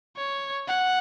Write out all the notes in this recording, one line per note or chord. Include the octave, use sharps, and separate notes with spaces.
C#5
F#5